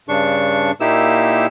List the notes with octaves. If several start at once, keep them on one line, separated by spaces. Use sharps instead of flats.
G2 C#3 D4 C#6
A#2 A#3 D#4 E4 G4 E6